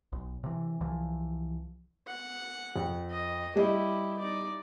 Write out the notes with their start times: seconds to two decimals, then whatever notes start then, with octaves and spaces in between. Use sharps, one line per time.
0.12 B1
0.44 C3 E3
0.81 C2 E3 F3
2.07 F#5
2.76 F2
3.10 D#5
3.56 G3 E4 G4 D#5
4.18 D#4 D5